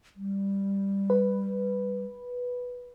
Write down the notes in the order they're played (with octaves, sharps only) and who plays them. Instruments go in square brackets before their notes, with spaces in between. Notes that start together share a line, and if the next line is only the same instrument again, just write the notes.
[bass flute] G3
[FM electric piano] B4